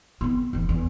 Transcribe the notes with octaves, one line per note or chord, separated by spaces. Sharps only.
B3 C4
F1 E2
E2